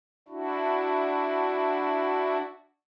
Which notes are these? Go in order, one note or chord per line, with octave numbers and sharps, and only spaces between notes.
D4 E4 F#4